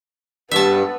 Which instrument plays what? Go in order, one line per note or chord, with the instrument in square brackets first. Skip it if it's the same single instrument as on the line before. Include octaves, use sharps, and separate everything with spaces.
[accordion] G2 [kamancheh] B3 [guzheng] E5 A5